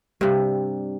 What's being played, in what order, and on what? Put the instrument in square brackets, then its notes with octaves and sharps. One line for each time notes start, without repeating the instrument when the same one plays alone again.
[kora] G2 C3 [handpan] G3